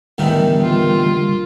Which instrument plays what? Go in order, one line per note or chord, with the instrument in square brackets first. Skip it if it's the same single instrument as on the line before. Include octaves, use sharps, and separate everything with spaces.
[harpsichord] E2 A2 D#3 [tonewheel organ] D3 G3
[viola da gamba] A#3 F4